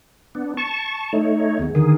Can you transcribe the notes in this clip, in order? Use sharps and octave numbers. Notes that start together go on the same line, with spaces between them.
B3 D4
A5 C#6
A3 D#4 C#5
D#2 B3 G#4
D3 D#3 G#4 A#4